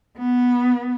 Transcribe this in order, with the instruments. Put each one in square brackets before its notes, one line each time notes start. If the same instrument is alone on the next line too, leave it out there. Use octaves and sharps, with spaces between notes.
[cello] B3